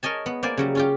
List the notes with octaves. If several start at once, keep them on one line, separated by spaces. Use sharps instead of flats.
A#4 C#5 D#5 G#5 A5
B3
A#3 C5 D5 G#5
C#3 F#3 G3
C#4 F4 G4